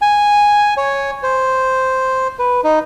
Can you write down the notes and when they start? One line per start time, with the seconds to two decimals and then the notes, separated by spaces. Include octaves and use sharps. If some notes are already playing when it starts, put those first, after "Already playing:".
0.02 G#5
0.77 C#5
1.23 C5
2.39 B4
2.64 D#4